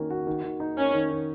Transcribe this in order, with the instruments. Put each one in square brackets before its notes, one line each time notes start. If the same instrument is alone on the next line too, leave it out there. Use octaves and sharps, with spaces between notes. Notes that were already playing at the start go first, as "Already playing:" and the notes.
Already playing: [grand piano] D#3 A#3 C#4 F#4
F#4
D#3
D#3
D#4
[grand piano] A#3 [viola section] C#4
[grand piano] D#3
D#3